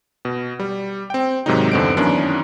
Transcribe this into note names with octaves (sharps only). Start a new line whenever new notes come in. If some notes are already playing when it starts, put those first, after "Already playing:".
B2
G3
C4 G5
G#2 C3 D#3 F#3 G#3 D#4
E2 G2 D3 C4 D#4 D7
F#2 D#3 E3 B3 C#4 D4